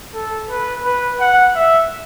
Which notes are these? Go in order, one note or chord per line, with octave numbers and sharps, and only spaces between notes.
A4
B4
B4
F#5
E5